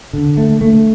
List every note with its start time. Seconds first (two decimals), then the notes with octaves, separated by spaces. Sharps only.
0.13 D3
0.37 A3
0.61 A3